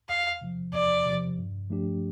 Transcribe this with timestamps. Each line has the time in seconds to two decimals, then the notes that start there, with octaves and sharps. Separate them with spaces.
0.09 E2 F5
0.41 C3 F3
0.74 E2 D5
1.06 C3 F3
1.38 G2
1.70 F3 A3 D4 G4